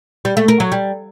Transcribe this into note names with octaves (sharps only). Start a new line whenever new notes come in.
G3
A3
A#4
F#3
G3